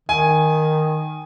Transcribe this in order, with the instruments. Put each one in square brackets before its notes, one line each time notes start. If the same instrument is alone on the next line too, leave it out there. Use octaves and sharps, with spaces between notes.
[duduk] D#3 [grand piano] G#5